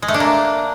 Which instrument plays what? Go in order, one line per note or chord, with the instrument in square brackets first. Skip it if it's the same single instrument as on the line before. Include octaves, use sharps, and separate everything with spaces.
[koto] G#3
A3
D4
A#3